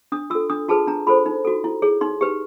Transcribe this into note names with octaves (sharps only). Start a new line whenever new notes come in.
D4 D#6
F4 A4 E6
D4 D#6
F4 G#4 B4 A5
D4 A#5
F4 A4 C5 B5
D#4
F#4 A4
E4
G#4 C#5
D#4 C6
G4 B4